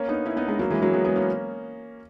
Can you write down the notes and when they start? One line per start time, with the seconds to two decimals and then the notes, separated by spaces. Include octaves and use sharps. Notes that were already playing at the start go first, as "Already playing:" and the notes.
Already playing: A#3 C#4
0.09 B3 D#4
0.25 C#4 E4
0.37 B3 D#4
0.48 G#3 B3
0.59 F#3 A#3
0.70 E3 G#3
0.82 F#3 A#3
0.93 G#3 B3
1.04 G#3 B3
1.16 A#3 C#4